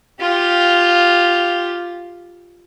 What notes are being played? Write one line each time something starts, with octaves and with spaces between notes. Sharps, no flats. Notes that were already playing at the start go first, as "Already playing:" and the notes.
F4 G4